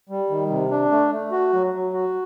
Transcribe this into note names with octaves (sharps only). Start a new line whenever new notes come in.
G3
D#3
C3
D4
A3
A3
F#4
F#3
F#3
F#4